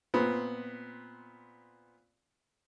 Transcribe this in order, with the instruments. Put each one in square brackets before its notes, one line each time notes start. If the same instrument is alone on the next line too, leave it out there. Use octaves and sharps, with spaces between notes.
[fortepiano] A#2 B3 C4